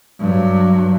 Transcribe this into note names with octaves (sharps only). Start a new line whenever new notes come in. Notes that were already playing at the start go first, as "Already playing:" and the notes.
G2 F#3